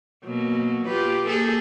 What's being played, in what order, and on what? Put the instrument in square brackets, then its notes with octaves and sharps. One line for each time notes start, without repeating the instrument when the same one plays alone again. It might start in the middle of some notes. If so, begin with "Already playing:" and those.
[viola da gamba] B2 F#3 A#3
F4 G4 B4
A#3 G#4 A4